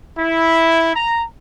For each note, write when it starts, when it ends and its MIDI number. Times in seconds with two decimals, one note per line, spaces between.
0.17 0.91 64
0.95 1.22 82